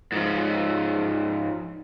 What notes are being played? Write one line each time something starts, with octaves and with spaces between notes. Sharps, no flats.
G#2 F3